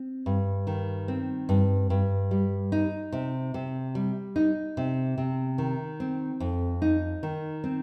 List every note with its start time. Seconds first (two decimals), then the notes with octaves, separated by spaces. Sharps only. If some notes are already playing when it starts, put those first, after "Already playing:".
Already playing: C4
0.26 G2
0.67 D#3
1.08 C4
1.49 G2
1.90 G2
2.31 G3
2.72 D#4
3.12 C3
3.54 C3
3.95 G3
4.36 D#4
4.77 C3
5.18 C3
5.58 D#3
6.00 C4
6.40 F2
6.82 D#4
7.23 D#3
7.64 C4